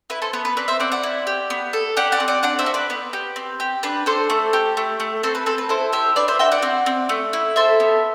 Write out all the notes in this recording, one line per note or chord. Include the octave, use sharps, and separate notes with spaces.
E4 B4
A4 C5
B3 B4
B4
C4 B4 D5
C5 E5
C4 D5 F#5
D5 F#5
E4
G4
B3
A4
G4 D5 F#5
D5 F#5
C4
D5 F#5
D4 D5 F#5
C5 E5
F#4
B4 D5
B3 B4
G4
C4
G4
D4 B4
D4 A4 C5
A3
G4
A3
A3
C4 A4 C5
B4
C4 A4
B4
E4 A4 C5
G4 C5 E5
D4 B4 D5
C5 E5
F#4 E5 G5
D5 F#5
C4
C4
A3
E4
A4 C5 E5
B3